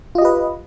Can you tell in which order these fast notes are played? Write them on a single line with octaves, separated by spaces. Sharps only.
F4 D#5 G4 B4